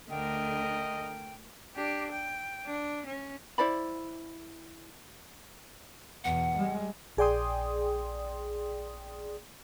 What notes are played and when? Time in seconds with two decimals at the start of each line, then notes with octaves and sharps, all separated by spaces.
0.10 D2 D3 A3 A#4 D#5 G5
1.76 D4 G4
2.12 G5
2.66 D4
3.06 C#4
3.58 E4 C5 D5 B5
6.24 E2 B2 F#5
6.56 G3 G#3
7.17 A#1 G#4 D5 G5 C6 D#6